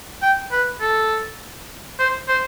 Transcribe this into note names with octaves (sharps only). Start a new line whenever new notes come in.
G5
B4
A4
C5
C5